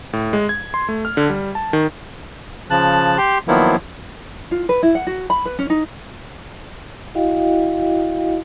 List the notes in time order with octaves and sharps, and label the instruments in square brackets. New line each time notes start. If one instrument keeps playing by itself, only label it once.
[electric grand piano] A2
G#3
G#6
C6
A3
F6
D3
G3
A5
D#3
[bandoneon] C#3 F3 A5 F#6
G4 C6
D#3 F3 F#3 A#3 B3 E4
[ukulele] F4
B4
E4
F#5
F#4
B5
B4
C#4
D#4
[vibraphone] E4 F#4 D#5 F5 G5